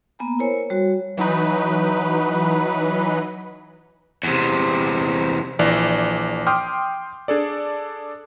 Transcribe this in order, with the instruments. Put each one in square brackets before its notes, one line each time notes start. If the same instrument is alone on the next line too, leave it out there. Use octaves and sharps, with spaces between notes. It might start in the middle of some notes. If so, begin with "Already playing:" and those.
[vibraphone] A#3 B3 G#5 A#5
E4 A#4 C5 C#5 G#5
G3 F#4 C#5
[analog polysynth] E3 F#3 D#4 B4
[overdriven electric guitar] E2 C3
[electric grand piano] A#1 E3 D5
G5 C6 D6 D#6 F6
D4 G#4 A4 D5